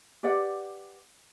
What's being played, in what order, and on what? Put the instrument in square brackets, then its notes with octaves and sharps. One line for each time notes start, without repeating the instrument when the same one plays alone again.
[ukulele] G4 B4 D5 F#5